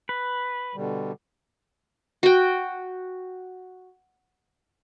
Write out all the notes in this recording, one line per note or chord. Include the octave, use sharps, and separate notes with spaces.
B4
B2 D3 G3
F#4 G5